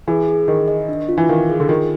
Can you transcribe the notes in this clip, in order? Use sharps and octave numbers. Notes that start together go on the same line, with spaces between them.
E3 G#4
G#4
D#3 D#5
D#5
D4
F4
E3
D#3 F5
G#4
D3
D#3 F4